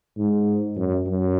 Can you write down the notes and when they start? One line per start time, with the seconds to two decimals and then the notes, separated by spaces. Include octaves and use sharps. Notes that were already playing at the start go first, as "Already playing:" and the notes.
0.18 G#2
0.77 F#2
1.07 F#2